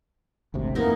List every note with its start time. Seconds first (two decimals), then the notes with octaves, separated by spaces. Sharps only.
0.54 G#1 D2 C3
0.75 F2 A#3 B3 D#4 E4